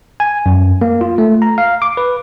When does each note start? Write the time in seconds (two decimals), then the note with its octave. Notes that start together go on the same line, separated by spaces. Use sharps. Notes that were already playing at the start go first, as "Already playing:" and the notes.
0.20 G#5
0.46 F#2
0.82 A#3
1.01 F4
1.18 A3
1.42 A#5
1.58 F5
1.82 D6
1.97 B4